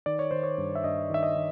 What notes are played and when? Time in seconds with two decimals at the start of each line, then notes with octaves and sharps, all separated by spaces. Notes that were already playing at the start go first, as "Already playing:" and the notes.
0.06 D#3 D5
0.19 C#5
0.31 D#3 C5
0.44 C#5
0.58 G2
0.75 E5
0.84 G2 D#5
1.10 D#3 E5
1.23 D#5
1.36 D#3